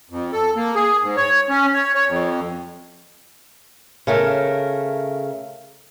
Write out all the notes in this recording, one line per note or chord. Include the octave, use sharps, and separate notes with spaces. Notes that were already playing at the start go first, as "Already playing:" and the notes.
F2
A4
A#3
G#4
G#2
C#5
C#4
C#5
C#5
F2
C#3 A3 A#4